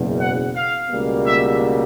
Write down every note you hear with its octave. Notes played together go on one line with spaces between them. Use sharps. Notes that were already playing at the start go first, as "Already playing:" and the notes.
Already playing: F#1 E2 B2
F#5
F5
C#2 B2 G3 A#3
E5